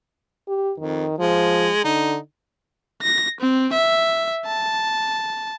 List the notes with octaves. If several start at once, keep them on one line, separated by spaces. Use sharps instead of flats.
G4
F2 D#3
F3 G#3
D3 D#4
A#6
C4
E5
A5